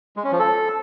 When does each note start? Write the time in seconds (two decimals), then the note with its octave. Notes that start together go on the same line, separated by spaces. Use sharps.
0.16 G#3
0.24 C#4
0.32 F3
0.39 A4